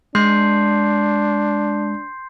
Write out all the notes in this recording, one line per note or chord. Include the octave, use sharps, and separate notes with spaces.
G#3 D4 C6 G6 C7